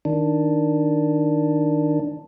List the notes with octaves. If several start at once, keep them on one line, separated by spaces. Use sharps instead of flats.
D#3 D4